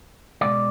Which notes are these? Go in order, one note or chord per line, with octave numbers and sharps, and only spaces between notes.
B2 G#3 D5